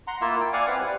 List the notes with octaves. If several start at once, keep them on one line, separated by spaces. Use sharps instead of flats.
F#5 A#5 C6
A#3 E4 F4 E5
G5
D5 F5 F#5 G#5
C4 E4 B4
G3